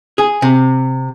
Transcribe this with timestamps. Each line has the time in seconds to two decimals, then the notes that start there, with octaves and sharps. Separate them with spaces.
0.18 G#4
0.42 C3